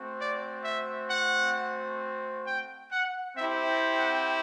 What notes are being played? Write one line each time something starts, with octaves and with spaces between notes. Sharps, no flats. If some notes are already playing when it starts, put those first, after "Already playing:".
Already playing: A3 C4 F#4
D5
E5
F#5
G5
F#5
C4 E4 G4 E5
F#5